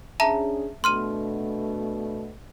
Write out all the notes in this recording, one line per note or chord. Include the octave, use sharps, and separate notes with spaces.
C#4 D4 G#4 E5 A5 A#5
B2 A3 D4 C6 F6 D#7